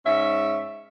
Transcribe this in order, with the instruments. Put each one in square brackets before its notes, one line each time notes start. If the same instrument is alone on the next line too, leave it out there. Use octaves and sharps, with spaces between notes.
[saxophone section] G#2 C#4 E5